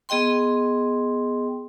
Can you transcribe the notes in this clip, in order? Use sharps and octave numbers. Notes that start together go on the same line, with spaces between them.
B3 G#4 D#5 G5 C6